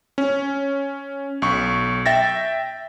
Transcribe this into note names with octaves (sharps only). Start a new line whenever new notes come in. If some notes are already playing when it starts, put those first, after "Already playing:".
C#4
B1 C#6
E5 G5 A6 A#6